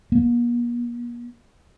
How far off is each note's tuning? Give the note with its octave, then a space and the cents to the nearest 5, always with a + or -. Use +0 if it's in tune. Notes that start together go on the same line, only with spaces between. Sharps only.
A#3 +45